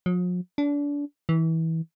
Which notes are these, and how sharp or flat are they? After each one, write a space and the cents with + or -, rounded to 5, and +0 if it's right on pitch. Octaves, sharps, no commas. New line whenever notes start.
F3 +45
D4 -30
E3 -25